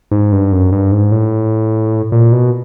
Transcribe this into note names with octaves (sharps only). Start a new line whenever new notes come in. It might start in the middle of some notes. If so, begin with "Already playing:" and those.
G#2
G2
F#2
G2
G#2
A2
A#2
B2